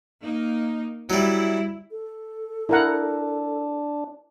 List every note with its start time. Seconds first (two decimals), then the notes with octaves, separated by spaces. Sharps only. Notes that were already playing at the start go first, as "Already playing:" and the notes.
0.23 A#3 D#4
1.10 F#3 G3 E4
1.91 A4
2.69 D4 E4 A#4 F#5